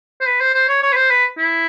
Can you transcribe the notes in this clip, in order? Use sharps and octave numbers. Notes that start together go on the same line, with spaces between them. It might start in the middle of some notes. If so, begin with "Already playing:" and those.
C5
B4
C5
C5
C#5
C#5
B4
C5
B4
E4